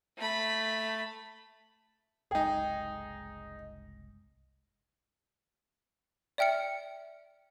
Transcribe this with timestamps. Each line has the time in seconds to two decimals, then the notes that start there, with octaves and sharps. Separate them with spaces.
0.18 A3 B5
2.31 F#1 C2 G#3 D#4 G#4 A4 G5
6.38 D5 E5 G5 F6 C#7